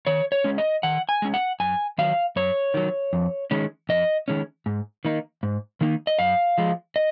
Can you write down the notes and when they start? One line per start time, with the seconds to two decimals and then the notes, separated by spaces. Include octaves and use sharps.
0.07 D#3 C#5
0.32 C#5
0.44 G#3 C#4
0.58 D#5
0.83 D#3 F#5
1.09 G#5
1.22 G#3 C#4
1.34 F#5
1.60 F#2 G#5
1.98 D#3 F#3 F5
2.36 F#2 C#5
2.74 D#3 F#3
3.13 F2
3.51 D#3 G#3 C#4
3.89 F2 D#5
4.28 D#3 G#3 C#4
4.66 G#2
5.05 D#3 A#3 D#4
5.43 G#2
5.81 D#3 A#3 D#4
6.07 D#5
6.19 F#2 F5
6.58 F3 G#3
6.96 D#5